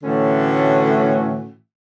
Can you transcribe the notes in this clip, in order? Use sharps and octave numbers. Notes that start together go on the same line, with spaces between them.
A2 D3 E3 A3 C#4 F#4